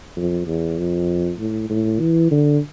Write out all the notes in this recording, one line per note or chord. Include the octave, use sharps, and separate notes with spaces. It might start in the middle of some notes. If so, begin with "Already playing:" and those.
F2
E2
F2
A2
A2
E3
D3